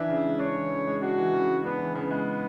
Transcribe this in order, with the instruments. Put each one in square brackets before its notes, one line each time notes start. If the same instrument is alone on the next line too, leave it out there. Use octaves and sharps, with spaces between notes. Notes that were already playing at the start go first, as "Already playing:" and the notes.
Already playing: [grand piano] E3 D4 [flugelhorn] E5
[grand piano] C#3
G#3
[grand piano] D4 [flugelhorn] C#5
[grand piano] E3
C#3
G#3
[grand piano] D4 [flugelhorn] F#4
[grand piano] E3
C#3
G#3
[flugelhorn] B3 [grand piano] D4
[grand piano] E3
[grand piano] C#3 [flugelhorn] B3
[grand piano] G#3